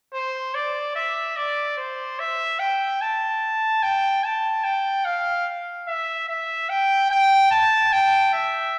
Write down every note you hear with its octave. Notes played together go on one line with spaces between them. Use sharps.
C5
D5
E5
D5
C5
E5
G5
A5
G5
A5
G5
F5
E5
E5
G5
G5
A5
G5
E5